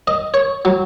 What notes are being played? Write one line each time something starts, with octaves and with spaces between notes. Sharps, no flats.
D#5
C#5
F#3